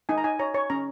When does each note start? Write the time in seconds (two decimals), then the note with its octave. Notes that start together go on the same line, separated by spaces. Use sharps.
0.09 D#4 G#5
0.18 A#5
0.24 D#4 G#5
0.39 C#5 A#5
0.54 C#5 C#6
0.70 C#4 A#5